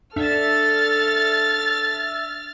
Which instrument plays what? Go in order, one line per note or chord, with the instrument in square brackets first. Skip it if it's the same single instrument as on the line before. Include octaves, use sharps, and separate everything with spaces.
[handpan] D4 [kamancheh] A4 [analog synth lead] E5 [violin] F6 A6